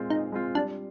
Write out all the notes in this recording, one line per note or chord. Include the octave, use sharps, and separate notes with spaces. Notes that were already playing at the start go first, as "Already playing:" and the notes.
Already playing: A#2 G#3 C4 F4
A#2 D#4
G#3 C4 F4
G3 D4